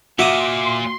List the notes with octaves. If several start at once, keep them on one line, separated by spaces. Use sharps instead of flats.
A#2 F#4 E5 C6 D6 D#6